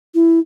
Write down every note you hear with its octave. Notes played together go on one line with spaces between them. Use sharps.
E4